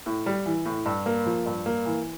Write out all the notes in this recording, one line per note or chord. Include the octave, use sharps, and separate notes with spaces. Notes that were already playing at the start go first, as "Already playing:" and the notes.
A2
G3
E3
A2
G2
A#3
F3
G2
A#3
E3